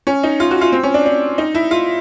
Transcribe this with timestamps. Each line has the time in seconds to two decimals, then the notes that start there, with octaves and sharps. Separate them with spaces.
0.07 C#4
0.23 D#4
0.40 F4
0.51 F#4
0.61 F4
0.72 C4
0.83 C#4
0.94 D4
1.06 D4
1.38 D#4
1.55 E4
1.71 F4